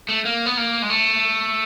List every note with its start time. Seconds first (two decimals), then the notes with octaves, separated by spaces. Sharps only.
0.09 A3
0.25 A#3
0.46 B3
0.57 A#3
0.82 G#3
0.90 A3